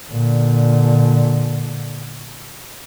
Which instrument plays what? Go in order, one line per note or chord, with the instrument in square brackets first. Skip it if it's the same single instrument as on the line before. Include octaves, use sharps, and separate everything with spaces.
[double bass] A#2 D3